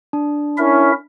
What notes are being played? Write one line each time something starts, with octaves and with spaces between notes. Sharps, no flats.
D4
C#4 E4 A#4 E5